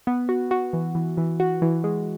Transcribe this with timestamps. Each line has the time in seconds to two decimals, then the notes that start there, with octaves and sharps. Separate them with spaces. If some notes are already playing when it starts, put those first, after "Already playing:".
0.07 B3
0.29 F#4
0.51 F#4
0.73 E3
0.95 E3
1.17 E3
1.40 F#4
1.62 E3
1.84 G#3